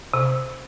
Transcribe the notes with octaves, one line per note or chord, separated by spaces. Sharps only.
C3